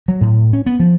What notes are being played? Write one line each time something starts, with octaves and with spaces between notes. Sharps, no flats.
F#3
A2
C#4
B3
F3